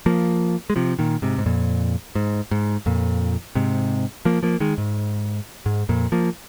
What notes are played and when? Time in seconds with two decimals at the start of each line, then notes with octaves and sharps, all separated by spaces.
0.06 F3 A#3
0.70 G#3
0.76 C3 F3
0.99 A#2 D#3
1.22 G#2 C3
1.38 G#2
1.46 F2 A#2
2.15 G#2
2.51 G#2
2.86 F2 A#2
3.55 G#2 C3
4.25 F3 A#3
4.43 F3 A#3
4.60 D#3 G#3
4.78 G#2
5.66 G#2
5.89 F2 A#2
6.12 F3 A#3